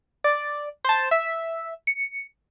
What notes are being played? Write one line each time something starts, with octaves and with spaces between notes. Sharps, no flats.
D5
C5 A5
E5
C#7